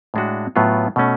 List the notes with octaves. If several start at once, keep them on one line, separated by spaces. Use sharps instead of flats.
A2 G#3 D4 F#4
A2 F#3 B3 F4
B2 A3 C#4